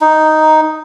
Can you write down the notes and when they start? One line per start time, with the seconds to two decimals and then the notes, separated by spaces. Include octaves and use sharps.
0.01 D#4